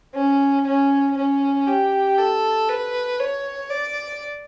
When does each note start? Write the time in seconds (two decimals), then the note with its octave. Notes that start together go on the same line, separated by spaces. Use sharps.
0.15 C#4
0.67 C#4
1.17 C#4
1.67 G4
2.19 A4
2.69 B4
3.20 C#5
3.70 D5